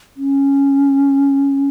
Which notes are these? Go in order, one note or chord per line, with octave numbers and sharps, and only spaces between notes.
C#4